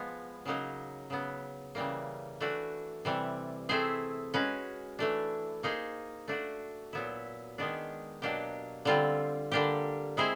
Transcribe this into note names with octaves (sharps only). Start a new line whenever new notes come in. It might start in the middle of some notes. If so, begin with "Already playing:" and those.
Already playing: F3 G#3 B3
C#3 F#3 A#3 D#4
C#3 F#3 B3
C#3 E3 G3 A#3
E3 A3 D4 F#4
C3 E3 G3
A3 C4 E4 G#4 C5
G#3 C#4 F#4 B4
E3 A3 D4
A#3 D#4 G#4 C5
A3 D4 F#4
A#2 F#3 B3 E4
D#3 G#3 B3 D4
B2 F#3 A#3 D4 G4
D3 G3 C4 F4
D3 G3 A#3 D4 G4
G#3 C4 E4 G#4 C5